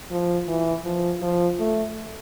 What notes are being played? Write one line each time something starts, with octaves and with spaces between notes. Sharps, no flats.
F3
E3
F3
F3
A3